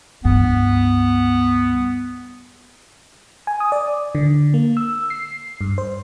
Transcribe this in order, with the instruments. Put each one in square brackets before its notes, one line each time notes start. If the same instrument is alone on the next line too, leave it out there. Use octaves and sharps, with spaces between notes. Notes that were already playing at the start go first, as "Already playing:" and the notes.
[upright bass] C#2 G2 [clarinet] B3
[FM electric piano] G#5
D#6
D5
D3
A#3
E6
C7
G2
C5